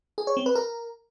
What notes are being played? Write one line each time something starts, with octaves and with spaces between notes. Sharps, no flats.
G#4
C#5
C4
B4
A#4